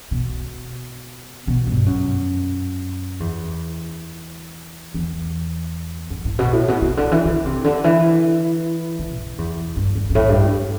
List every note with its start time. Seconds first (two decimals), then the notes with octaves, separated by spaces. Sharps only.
0.11 B2
1.47 B2
1.67 G2
1.86 F#2
3.20 E2
4.94 E2
6.10 F#2
6.25 A2
6.39 B2
6.53 A2
6.68 B2
6.82 C3
6.97 D3
7.12 E3
7.25 D3
7.45 C3
7.64 D3
7.84 E3
8.99 D3
9.18 F#2
9.38 E2
9.76 G2
9.95 G2
10.10 G2
10.15 A2
10.29 G2